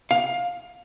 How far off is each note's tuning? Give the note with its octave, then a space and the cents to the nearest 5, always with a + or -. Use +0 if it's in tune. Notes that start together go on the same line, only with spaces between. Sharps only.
F5 +20